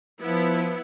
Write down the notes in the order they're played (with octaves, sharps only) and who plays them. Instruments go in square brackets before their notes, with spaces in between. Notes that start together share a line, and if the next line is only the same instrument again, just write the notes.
[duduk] F3 [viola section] B3 E4